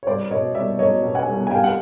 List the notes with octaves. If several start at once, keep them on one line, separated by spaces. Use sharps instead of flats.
C#5
C2 C5 D5
B2 C#5 D#5
C2 D5 E5
F#3 C#5 D#5
B2
F#5 G#5
C2
G#5
G3 F5 G5
F#5